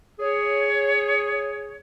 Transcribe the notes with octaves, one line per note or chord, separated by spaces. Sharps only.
G#4 C#5